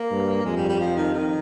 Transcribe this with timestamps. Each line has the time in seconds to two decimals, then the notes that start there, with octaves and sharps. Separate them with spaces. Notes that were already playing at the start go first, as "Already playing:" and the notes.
Already playing: A#3
0.11 G2
0.45 F2 G#3
0.56 G3
0.69 G3
0.80 F3
0.97 D#3
1.14 D#3